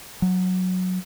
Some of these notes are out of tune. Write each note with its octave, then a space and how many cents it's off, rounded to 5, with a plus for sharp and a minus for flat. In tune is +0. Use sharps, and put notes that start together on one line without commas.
F#3 -10